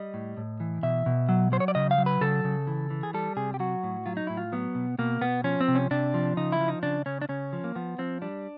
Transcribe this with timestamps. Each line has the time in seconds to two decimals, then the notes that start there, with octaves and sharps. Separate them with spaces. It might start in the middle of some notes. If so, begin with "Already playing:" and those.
Already playing: G3 D#5
0.14 A2
0.37 A2
0.60 E3
0.83 B2 E5
1.06 B2
1.29 F#3
1.52 F#3 C5
1.60 C#5
1.68 D5
1.75 C#3 D#5
1.91 F5
1.98 F#3
2.06 B4
2.21 C#3 A4
2.44 C#3
2.67 E3
2.90 E3
3.03 G#4
3.14 G3 A4
3.37 C3 G#4
3.54 G4
3.60 F#3 F#4
3.83 A2
4.06 F#3 F4
4.17 D#4
4.27 A2 E4
4.37 F4
4.52 F#3 B3
4.75 B2
4.99 B2 A#3
5.21 B2 B3
5.44 F3 C#4
5.61 C4
5.68 C3
5.75 C#4
5.91 C3 D4
6.14 F3
6.37 C#3 D#4
6.52 E4
6.60 F3
6.68 D#4
6.83 C#3 D4
7.06 C#3 C#4
7.22 D4
7.29 C#3 C#4
7.53 F3
7.64 A#3
7.75 F3 B3
7.98 F3 C4
8.22 G3 D4